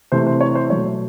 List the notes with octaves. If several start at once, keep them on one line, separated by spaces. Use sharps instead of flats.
C3 E3 A3 C5
C5
C#5
C5
B2 F#3 A3 C#5